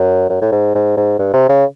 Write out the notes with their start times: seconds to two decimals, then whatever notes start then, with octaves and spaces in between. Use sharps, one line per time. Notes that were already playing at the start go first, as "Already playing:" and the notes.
Already playing: F#2
0.30 F#2
0.42 A2
0.52 G#2
0.75 G#2
0.97 G#2
1.19 G2
1.33 C3
1.49 C#3